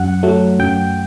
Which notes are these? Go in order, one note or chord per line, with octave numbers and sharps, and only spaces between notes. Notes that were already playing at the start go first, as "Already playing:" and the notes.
Already playing: F#2 F#5
F#3 A3
F#2 G5